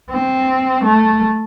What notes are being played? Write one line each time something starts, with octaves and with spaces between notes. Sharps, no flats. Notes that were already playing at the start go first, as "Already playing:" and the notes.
C4
A3